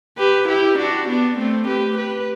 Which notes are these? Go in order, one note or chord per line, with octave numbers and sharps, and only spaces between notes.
G4 B4
E4 G4
D4 F#4
B3 D4
A3 C4
G4 B4
G4 B4